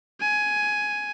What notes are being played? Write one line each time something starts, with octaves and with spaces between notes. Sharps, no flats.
G#5